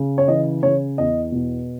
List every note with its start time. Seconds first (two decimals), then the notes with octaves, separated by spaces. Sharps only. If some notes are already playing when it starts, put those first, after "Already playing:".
Already playing: C#3
0.18 C#5
0.28 E3 D#5
0.63 C#3 C#5
0.98 E2 D#5
1.32 B2